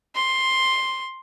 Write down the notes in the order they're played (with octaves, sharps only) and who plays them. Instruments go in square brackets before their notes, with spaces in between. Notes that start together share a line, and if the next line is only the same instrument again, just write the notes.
[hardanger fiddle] C6